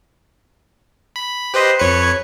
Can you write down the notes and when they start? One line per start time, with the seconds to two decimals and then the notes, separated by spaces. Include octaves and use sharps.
1.16 B5
1.54 G4 B4 C5 D#5
1.79 F2 B4 C#5 C#7